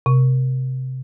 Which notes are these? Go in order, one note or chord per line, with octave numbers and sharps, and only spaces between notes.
C3